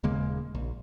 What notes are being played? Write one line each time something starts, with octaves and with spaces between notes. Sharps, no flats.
D#1 C#3 G#3 A#3
A#1